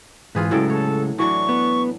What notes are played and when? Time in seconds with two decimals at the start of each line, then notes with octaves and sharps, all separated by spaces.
0.35 G#2 E3 F4 G#4 B4
0.51 A2 C#3 F#3 G#3 A4 G5
0.70 A4 C#5
1.18 E3 F#3 D4 C#6
1.49 B3